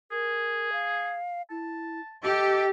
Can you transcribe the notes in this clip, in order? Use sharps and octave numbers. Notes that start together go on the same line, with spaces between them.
G#4 A#4
F5
E4 A5
G4 A4 D#5